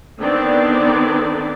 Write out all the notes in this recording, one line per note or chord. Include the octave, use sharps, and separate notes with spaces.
D3 D#3 B3 C4 D5